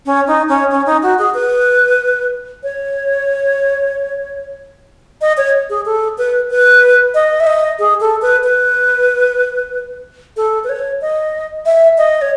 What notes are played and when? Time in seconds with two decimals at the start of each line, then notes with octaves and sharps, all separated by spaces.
0.06 C#4
0.27 D#4
0.48 C#4
0.70 C#4
0.86 D#4
1.03 F#4
1.19 G#4
1.34 B4
2.63 C#5
5.21 D#5
5.37 C#5
5.70 G#4
5.86 A4
6.18 B4
6.50 B4
7.15 D#5
7.40 E5
7.47 D#5
7.79 G#4
8.00 A4
8.22 B4
8.44 B4
10.37 A4
10.64 B4
10.69 C#5
11.01 D#5
11.66 E5
11.98 D#5
12.22 C#5